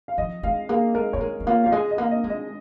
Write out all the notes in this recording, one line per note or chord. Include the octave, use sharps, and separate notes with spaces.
F5
F3 D#5
G#3 F5
A#3 G#4
G#3 A#4
A#3 C#5
G#3 A#4
G#3
A#3 F4
F3 F5
G#3 D#5
D#5
A#3
D#5
G#3
D#5